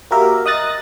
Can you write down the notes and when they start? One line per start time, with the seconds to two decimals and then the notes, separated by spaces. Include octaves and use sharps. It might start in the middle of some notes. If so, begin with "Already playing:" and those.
0.11 A#3 F#4 G4 A#4 E5
0.46 D#5 D#6 F#6 A6 A#6